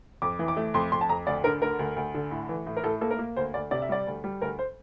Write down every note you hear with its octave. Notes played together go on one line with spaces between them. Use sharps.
F2 D6
E3
D6
A3
F2 C6
F2 C6
A5
F2 A#5
D2 D5
D3 A#4
D2 A#4
D2
D2
D3
A2
E3
A2
A#4
A2 A4
A#3 A4
A#4
A#3
D2 C5
D2 D5
C3 D5
E5
G3 D5
D2
G3
D2 A#4
C5